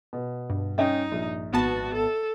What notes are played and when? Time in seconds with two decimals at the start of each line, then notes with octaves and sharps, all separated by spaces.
0.13 B2
0.50 G2
0.78 C#4 D#4 D#5 G5
1.12 A#1
1.52 G#1 B3 F#4 A5
1.94 A4